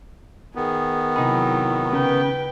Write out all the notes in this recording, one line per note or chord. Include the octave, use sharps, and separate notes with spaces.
D#3 B3 G#4
C3 F#3 D#4 E4 G#4 B5
C#3 B4 G5